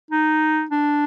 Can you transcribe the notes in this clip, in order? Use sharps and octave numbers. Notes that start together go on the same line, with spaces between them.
D#4
D4